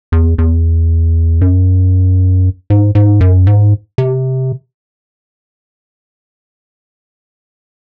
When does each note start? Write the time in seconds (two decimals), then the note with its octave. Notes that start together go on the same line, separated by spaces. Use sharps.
0.12 E2
0.38 E2
1.41 F#2
2.70 G#2
2.95 G#2
3.21 F#2
3.47 G#2
3.98 C3